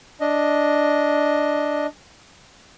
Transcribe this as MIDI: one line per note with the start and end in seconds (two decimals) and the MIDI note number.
0.21 1.86 62
0.21 1.86 75